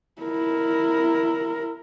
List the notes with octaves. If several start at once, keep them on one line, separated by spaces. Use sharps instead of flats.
E4 A#4